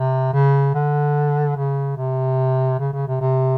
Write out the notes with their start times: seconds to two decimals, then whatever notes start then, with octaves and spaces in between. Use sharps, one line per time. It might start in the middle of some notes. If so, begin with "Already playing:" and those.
Already playing: C3
0.33 C#3
0.74 D3
1.57 C#3
1.97 C3
2.79 C#3
2.93 C#3
3.07 C3
3.21 C3